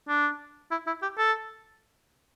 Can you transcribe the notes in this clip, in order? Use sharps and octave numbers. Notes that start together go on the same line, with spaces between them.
D4
E4
E4
G4
A4